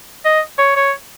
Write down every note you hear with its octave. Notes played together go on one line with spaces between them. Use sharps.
D#5
C#5
C#5